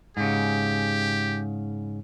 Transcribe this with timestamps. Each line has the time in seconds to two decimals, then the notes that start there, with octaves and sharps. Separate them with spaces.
0.17 G#2 C#3 G4